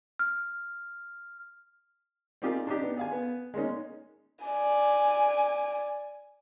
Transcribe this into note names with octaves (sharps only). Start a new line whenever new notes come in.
F6
C4 D#4 F4 G4 G#4 A#4
D4 D#4 G4
B3
G#4 F5 G#5
B3
G#3 A#3 C#4 D#4
D5 G#5